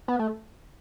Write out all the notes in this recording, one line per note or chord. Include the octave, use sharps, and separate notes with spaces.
B3
A3